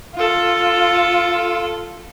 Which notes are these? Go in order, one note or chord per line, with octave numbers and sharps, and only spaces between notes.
F4 A4